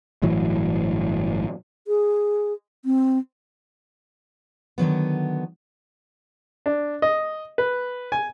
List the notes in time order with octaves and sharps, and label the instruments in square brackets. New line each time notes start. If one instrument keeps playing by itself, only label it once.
[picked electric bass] G1 A2 E3 F#3
[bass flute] G#4
C4
[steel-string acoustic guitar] D3 D#3 F#3 B3
[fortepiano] D4
D#5
B4
G#5